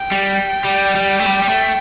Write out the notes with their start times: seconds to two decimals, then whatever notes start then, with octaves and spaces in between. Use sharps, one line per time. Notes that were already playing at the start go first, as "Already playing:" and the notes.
Already playing: G5
0.11 G3
0.65 G3
0.95 G3
1.19 A3
1.26 G3
1.42 G3
1.49 A3